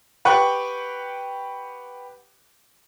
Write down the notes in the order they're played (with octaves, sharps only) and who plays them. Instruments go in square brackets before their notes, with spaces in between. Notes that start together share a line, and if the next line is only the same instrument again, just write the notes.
[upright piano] G4 B4 F#5 G5 C#6 F#6